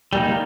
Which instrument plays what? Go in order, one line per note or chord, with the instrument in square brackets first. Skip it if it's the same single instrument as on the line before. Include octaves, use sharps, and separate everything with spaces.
[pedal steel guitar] G3 A#3 D#4